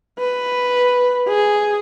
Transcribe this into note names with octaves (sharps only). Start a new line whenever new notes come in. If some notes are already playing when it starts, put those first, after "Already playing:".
B4
G#4